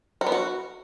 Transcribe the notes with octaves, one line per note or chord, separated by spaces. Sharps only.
F#4
B3
F#4